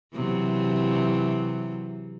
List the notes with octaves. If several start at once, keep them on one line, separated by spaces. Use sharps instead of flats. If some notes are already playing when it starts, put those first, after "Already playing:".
C3 E3 F#3